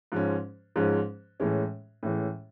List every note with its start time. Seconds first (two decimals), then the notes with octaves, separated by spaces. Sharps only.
0.12 G#2 F3 G#3 C#4
0.76 G#2 F3 G#3 C#4
1.40 A2 E3 G#3 C#4
2.03 A2 E3 G#3 C#4